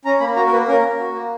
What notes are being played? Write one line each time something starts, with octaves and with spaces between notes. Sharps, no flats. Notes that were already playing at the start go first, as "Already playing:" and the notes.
C#4 A#5
A#3 B5
F#4 A#5
A#4
A#3 B4
C#4 A#4
A#3
F#4
A#3